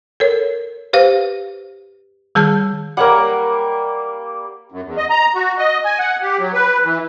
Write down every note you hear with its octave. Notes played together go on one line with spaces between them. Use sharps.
A4 A#4 C#5
G4 B4 C5 F5
D#3 G3 G#4 A5 F6 G6
G3 A#3 A#4 C#5 F#5
F#2
E2
D#5
A#5
F#4
D#5
G#5
F#5
G4
F#3
B4
E3